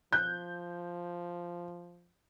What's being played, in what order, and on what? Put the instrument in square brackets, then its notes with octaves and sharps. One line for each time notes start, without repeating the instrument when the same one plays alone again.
[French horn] F3 [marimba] F#6 [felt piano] G6